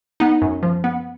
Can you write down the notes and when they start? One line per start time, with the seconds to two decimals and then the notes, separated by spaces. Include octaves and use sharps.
0.20 B3 D#4
0.42 F#2
0.63 F3
0.84 B3